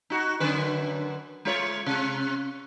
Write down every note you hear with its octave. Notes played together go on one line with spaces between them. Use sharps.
D#4 F#4
F#2 D3 B4
G#3 F4 C#5
C3